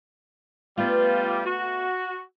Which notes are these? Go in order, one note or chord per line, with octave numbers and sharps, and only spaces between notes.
G3 A3 B3 F4 E5
F#4